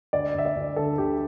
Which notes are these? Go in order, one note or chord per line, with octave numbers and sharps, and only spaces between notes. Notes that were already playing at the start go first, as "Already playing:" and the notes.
D2 D5
D2 E5
D5
D2
D3 A4
D2 G4